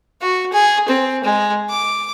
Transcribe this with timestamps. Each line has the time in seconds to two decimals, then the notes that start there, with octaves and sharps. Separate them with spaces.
0.22 F#4
0.53 G#4
0.88 C4
1.24 G#3
1.70 D6